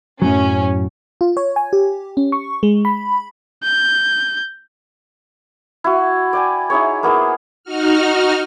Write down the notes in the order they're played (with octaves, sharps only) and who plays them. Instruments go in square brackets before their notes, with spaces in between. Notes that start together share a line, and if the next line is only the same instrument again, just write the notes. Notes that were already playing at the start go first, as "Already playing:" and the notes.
[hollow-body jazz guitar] F#2 A2 F#3 [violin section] C#4
[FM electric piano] F4
C#5
G#5
G4
C#4
C#6
G#3
B5
[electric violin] G6
[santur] E4 F#4
D5 G5 G#5
D#4 E4 G#4 C#5
A#3 B3 E4 G#4
[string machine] D#4 F#4 F6